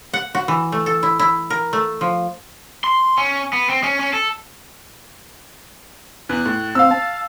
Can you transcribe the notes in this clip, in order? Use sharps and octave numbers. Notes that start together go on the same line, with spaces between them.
F#5
F#4
E3
A3
A4
E4
E4
A#4
A3
F3
C6
C#4
B3
C4
C#4
C#4
A4
E2 F#6
A2
C4 F5 E6
A5